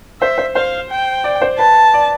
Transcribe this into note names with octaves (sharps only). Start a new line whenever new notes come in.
C5 E5
C5
C5 F5
G5
D5
C5
B4 A5
D5